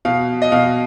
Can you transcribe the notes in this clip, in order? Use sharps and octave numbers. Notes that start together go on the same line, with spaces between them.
B2 F5
D#5
B2 F5